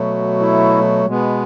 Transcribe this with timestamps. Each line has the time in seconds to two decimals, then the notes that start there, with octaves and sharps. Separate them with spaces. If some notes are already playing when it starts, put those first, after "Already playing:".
Already playing: B2 F#3 A3
0.40 E4
1.06 B2 G#3 B3